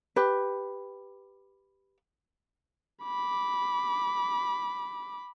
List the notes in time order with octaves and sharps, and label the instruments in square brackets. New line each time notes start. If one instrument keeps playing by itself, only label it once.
[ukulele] G4 B4
[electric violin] B5 D6